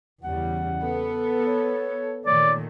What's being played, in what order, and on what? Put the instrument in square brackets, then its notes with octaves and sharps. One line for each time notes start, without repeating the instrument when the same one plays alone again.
[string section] E2 C#3 G3 [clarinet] F#5
[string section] B3 [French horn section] A4
[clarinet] C#5
[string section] A#2 D#3 A3 [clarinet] C#5 [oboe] D5